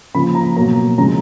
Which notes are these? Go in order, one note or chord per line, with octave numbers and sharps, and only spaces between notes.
C#3 F3 A#3 B5
A#5
B2 F#3 A#3 A#5
C#3 F3 G#3 A#5